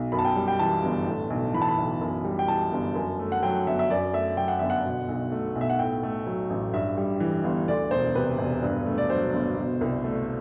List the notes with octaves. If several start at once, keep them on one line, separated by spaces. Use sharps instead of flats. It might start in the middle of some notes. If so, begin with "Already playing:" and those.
Already playing: B1
F#2 B5
A5
G5
G3
G5
E3 A5
G1
A2
B1
E3 B5
A5
B5
B1
F#2
G3
G5
E3 A5
G1
F#2
A3
F#5
F#3 G5
G1 E5
E5
F#2 D5
A3 E5
F#3 G5
F#5
G1 E5
F#5
B2
B1
A3
B1
E5
F#5
A2 G5
A3
F#3
A1
G2 E5
G3
E3
G1
D2 D5
E1 C5
C3 B4
E1
G2
A3
D5
F#3 C5
G1
B2
C2
A3